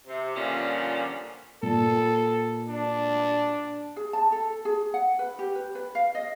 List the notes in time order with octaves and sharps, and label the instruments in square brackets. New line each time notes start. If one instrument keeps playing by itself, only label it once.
[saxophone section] C3
A#2 D3 F3 G3 C#4
[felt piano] A#2 [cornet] A4
[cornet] D4
[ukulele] G#4
A5
A4
G#4
F#5
B4
G4
B4
B4
F5
D#5